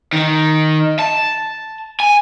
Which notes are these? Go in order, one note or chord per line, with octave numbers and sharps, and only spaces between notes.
D#3
A5
G#5